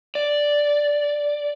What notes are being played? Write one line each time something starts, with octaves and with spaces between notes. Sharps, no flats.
D5